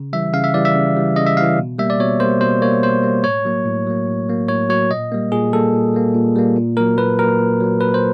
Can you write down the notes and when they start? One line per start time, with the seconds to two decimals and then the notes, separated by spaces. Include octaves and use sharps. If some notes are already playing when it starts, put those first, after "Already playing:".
Already playing: C#3
0.13 E3 G3 E5
0.34 C#3 F5
0.44 E5
0.54 E3 G3 D5
0.65 E5
0.75 C#3
0.96 E3 G3
1.16 C#3 D#5
1.27 E5
1.37 E3 G3 F5
1.58 B2
1.78 G3 A#3 E5
1.90 D5
2.00 B2 C#5
2.20 G3 A#3 C5
2.41 B2 C5
2.62 G3 A#3 C#5
2.83 B2 C5
3.03 G3 A#3
3.24 A2 C#5
3.45 F#3 A#3
3.65 A2
3.86 F#3 A#3
4.08 A2
4.29 F#3 A#3
4.48 A2 C#5
4.69 F#3 A#3 C#5
4.91 A#2 D#5
5.12 G3 A#3
5.32 A#2 G#4
5.53 G3 A#3 A4
5.74 A#2
5.94 G3 A#3
6.15 A#2
6.36 G3 A#3
6.57 A#2
6.77 F#3 A#3 A#4
6.98 A#2 B4
7.19 F#3 A#3 A#4
7.40 A#2
7.60 F#3 A#3
7.81 A#2 B4
7.94 C5